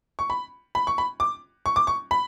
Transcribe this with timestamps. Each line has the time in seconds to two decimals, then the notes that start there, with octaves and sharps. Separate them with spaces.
0.19 C#6
0.30 B5
0.75 B5
0.87 C#6
0.98 B5
1.20 D6
1.66 C#6
1.76 D6
1.87 C#6
2.11 B5